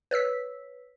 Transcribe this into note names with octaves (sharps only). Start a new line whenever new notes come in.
B4 C#5 E6 B6